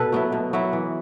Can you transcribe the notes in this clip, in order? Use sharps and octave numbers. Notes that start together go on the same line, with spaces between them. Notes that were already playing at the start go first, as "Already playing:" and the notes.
Already playing: B2 A4 B4
F#3 B3 E4
B2
F#3 B3 E4
E3